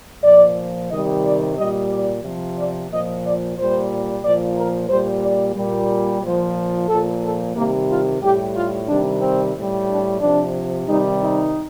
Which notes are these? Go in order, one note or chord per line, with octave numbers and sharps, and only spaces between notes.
A#2 F3 D5
C3 D#3 G3 D#5
D5
A#2 G3 D#5
D5
C3 F3
D5
A#2 F3 D#5
D5
A#2 G3 C5
A#2 F3 D5
A#4
A#2 G3 C5
D5
A#2 G3
A#2 F3 C5
A#2 F3 A4
A4
C3 D#3 G3 A#3
F4
A2 G3 G4
F4
C3 D#3 G3 D4
C4
A2 G3
D4
C3 F3 D4
C3 D#3 G3 D#4
D#4